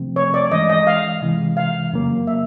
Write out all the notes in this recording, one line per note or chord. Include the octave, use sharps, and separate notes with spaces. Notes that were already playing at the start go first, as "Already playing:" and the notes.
Already playing: C3 F3 A3 C4
C#5
D5
G2 E3 G#3 C#4 D#5
D#5
F5
C3 E3 G#3
F5
F#2 C#3 F#3 A#3
E5